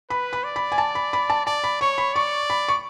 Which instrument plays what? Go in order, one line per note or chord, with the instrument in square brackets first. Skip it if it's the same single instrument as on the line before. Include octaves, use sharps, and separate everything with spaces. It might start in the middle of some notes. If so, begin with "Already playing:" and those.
[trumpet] B4 [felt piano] B5
[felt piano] B5
[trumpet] D5
[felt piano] B5
G#5
A5
B5
B5
A5
[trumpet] D5 [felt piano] A5
[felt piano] B5
[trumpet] C#5 [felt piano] C#6
[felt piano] B5
[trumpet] D5 [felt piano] C#6
[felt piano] B5
C#6